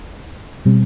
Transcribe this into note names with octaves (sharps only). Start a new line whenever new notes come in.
B2 G3 C4